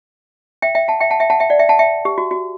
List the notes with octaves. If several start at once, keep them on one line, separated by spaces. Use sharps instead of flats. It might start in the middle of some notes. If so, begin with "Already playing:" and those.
E5 G5
E5 G5
F#5 A5
E5 G5
F#5 A5
E5 G5
F#5 A5
E5 G5
D5 F#5
E5 G5
F#5 A5
E5 G5
G4
F#4
F#4